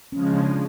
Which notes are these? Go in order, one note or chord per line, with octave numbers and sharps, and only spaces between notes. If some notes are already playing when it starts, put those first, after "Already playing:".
C#3 F3 G#3 C#4
D4
D4